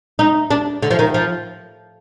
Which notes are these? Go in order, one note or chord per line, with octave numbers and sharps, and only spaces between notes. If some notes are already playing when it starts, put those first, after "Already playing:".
D#4
D4
D3
F3
D#3
F3